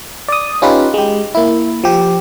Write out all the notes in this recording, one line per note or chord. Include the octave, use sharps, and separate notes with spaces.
D5 D#6
C#4 D#4 F4 G4 B4
G#3 G4
A#3 E4
F3 G4